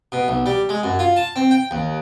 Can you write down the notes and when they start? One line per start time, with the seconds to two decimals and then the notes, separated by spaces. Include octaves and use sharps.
0.12 B2
0.28 B1
0.46 G3
0.69 G#3
0.83 F#2
0.99 F4
1.16 A5
1.36 C4
1.51 G5
1.71 D#2